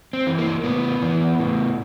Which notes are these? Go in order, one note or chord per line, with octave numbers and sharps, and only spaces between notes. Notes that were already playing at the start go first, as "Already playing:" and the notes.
C4
E3
A#3
A2 B3
E3
A2